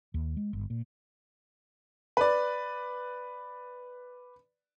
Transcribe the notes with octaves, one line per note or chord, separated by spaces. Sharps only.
D#2
G#3
G1
A#2
B4 D5